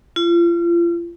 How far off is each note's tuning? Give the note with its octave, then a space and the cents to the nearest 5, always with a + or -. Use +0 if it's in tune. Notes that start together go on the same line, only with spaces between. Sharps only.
F4 -35